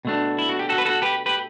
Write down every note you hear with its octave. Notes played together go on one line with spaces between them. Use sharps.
B2 A3 D4
E4
F#4
G4
F#4 A4
B4
F#4 A4
G4 B4
G4 B4